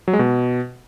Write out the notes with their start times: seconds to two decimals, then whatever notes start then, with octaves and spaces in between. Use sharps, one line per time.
0.08 F#3
0.13 G#3
0.19 B2